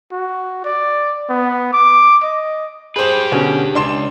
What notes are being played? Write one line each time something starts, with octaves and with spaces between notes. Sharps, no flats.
F#4
D5
B3
D6
D#5
G4 G#4 B4 C5
B2 D3 C#4
C#2 D4 C6 E7